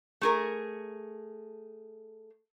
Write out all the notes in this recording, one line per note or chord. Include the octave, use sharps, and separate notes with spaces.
A3 G#4 A#4